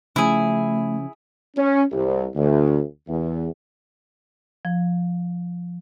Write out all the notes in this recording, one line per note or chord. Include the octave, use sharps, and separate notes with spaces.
C#3 F3 A3 C#4 E4 G#4
C#4
C2
D2
E2
F3